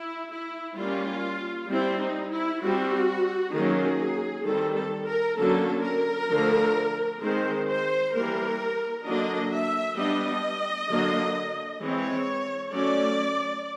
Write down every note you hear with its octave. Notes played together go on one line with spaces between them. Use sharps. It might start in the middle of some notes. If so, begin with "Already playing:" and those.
Already playing: E4
E4
G3 A#3 C#4 F4
G3 C4 E4
D#4
E4
G3 C4 F#4
D#3 F#3 A#3 C#4 G#4
D#3 G3 C4 A4
A4
A#4
D3 F#3 A#3 C#4 A4
A#4
D3 F3 A3
D#3 G#3 C4 C5
C5
E3 G3 A#3 A#4
D3 F#3 A#3 D4 D#5
E5
G3 B3 D4 D#5
D3 F#3 A#3
E3 G#3 C4 C#5
F#3 A3 C#4 D5